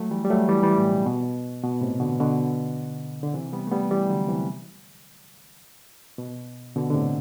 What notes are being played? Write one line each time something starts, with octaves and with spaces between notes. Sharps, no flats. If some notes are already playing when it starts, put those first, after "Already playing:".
Already playing: F#3 A3
E3 G3
G3
F#3 A3
E3 G3
E3 G3
A2
B2
B2
B2
A2 C3
B2 D3
B2 D3
D3
C3 E3
G3 B3
A3
G3 B3
E3 G3
D3 F#3
C3 E3
B2
B2 D3
D3
A2 C3